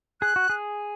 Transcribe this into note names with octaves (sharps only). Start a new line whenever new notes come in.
G#4 F#6
F#4
G#4